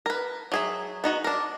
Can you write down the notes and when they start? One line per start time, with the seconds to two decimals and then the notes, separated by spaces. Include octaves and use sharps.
0.06 A#4 B4
0.52 F#3 G#4 E5
1.04 B3 D#4 F#4
1.24 D4 A#4